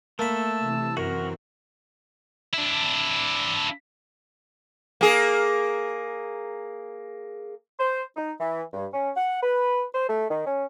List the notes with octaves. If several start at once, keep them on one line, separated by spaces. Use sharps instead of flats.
A3 A#3 A5 B5 E6
C3 E3
F#2 E3 C4 F#4 A#4
D4 E4
A#3 G#4
C5
D#4
E3
G2
C#4
F#5
B4
C5
A3
D#3
C#4